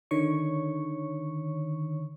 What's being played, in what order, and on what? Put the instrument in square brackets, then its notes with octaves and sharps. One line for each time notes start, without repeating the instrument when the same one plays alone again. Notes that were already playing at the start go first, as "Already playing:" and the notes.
[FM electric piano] D3 D#3 C#5 C#6